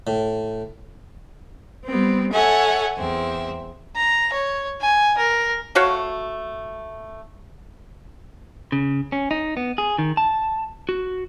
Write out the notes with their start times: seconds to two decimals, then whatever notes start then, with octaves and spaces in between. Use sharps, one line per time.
0.07 A2
1.86 G3 B3 C4
2.32 A4 C#5 E5 F#5 G#5
2.97 E2 C4 E5
3.96 A#5
4.33 C#5
4.81 G#5
5.18 A#4
5.75 A3 F#4 C#5 F5
8.72 C#3
9.12 C#4
9.31 D#4
9.57 B3
9.78 G#4
9.98 D#3
10.17 A5
10.89 F#4